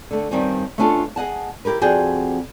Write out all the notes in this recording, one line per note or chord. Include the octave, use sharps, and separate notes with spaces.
D3 A3
G2 D#3 G3 C4 C#4
A3 B3 C#4 D4 F4 A4
G#4 D#5 F#5 A5
E4 G4 A#4 B4
F2 C4 F#4 G#4 D5 G5